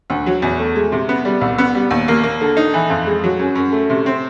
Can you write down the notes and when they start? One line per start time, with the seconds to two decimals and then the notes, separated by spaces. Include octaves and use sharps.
0.10 D2
0.26 F#3
0.42 E2
0.59 A3
0.76 G#3
0.92 C3
1.09 B3
1.25 G3
1.41 C2
1.58 B3
1.75 G3
1.91 D#2
2.08 A#3
2.23 A#3
2.41 D3
2.57 D#4
2.74 E3
2.90 F2
3.06 G#3
3.24 F#3
3.39 F#2
3.55 F#2
3.72 A3
3.90 C3
4.06 C4